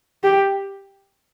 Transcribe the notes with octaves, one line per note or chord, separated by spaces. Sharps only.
G4